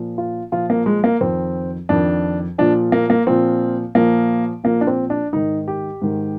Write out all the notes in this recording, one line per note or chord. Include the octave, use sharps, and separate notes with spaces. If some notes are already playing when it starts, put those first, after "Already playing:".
Already playing: A#2 F3
F4
A#2 F3 F4
A#3
G#3
A#3
F2 D#3 C4
F2 D#3 D4
A#2 F3 D4
A#3
A#3
A#2 F3 C4
A#2 F3 A#3
A#2 F3 A#3
D4
C4
D4
G#2 D#3 D#4
G4
G#2 D#3